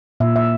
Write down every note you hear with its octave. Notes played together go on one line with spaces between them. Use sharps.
A#2 E5
E5